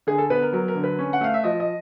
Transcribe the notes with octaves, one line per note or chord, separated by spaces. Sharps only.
D3 G#4
A4
B3 B4
A#4
F#3 A#4
A#4
D3
B4
C#4
F#5
A3 F5
E5
F3 D#5
D#5